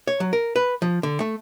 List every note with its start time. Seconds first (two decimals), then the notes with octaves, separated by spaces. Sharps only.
0.07 C#5
0.20 F#3
0.33 A#4
0.56 B4
0.82 F3
1.03 D3
1.20 A3